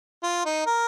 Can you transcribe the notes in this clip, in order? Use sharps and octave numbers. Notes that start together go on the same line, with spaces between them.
F4
D#4
A#4